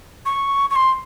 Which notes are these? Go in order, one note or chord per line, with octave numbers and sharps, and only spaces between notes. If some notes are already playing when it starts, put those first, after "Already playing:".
C#6
C#6
C6